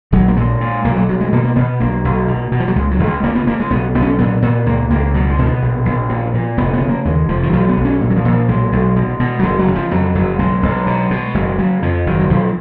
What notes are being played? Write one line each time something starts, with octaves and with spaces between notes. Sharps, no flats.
A#1 F#3
A#3
A#2 G#3
A#2
B1 A#3
F#3
B1 F#3
G#3
B2 A#3
A#3
B2 B3
B1 A#3
B1
B2
B2
F3
F#3
C#2 G#3
F#3
C#2
G#3
C#3 A#3
B3
C#3 A#3
G#3
B1 B3
B1 B3
C#4
A#2 B3
A#2 B3
C#2 A#3
C#2 A#3
B2 F#3
G#3
B2
B3
A#1
A#1
A#2
A#2
F1 B3
B3
C#3
A#3
D#2 G#3
F1 F3
D#3
B1 F3
B3
B1
C#4
A#2
F#3
F3
A#2
F3
B1 G#3
B1
B2
B2
F#3
F#1 G#3
F#3
C#3
F3
F2 F#3
F#1 F#3
B1 G#3
B1
B2
B2
F#1 G#3
C#3 F#3
F2 F3
F#1 D#3
F#3
B1 F3